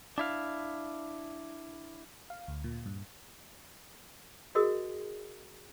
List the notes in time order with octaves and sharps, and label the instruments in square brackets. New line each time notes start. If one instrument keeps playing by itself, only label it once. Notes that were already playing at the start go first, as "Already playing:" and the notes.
[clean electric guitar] D4 E4 F5
[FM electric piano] F5
D2
A#2
G2
[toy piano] F#4 G#4 A#4 D#5 D#6